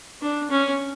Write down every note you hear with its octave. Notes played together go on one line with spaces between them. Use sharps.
D4
C#4